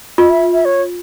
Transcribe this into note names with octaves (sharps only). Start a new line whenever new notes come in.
F4 D#5
E5
E5
C#5